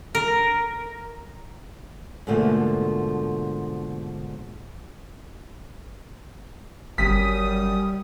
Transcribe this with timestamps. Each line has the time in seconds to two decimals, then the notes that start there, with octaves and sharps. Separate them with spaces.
0.15 A#4
2.27 G#2 B2 D3 F3 A3 A#3
6.98 G1 F#2 G3 D#6 B6